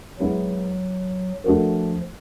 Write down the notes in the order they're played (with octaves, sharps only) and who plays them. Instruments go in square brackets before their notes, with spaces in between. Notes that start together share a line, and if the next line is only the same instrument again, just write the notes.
[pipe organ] F#3 [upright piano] G#3 B3 E4
[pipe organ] F3 [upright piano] A3 D4 F#4 A#4